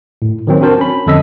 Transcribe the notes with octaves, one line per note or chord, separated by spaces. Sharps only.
A2
D#3 F#3 C4
C4 D4 F#4 A#4 C5 A5
C#4 B5
F2 D3 A4 D#5 E6 B6